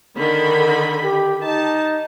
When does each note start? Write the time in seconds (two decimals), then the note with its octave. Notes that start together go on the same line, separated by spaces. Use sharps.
0.16 D3 D#3 B5
1.04 G4
1.42 D#4 A5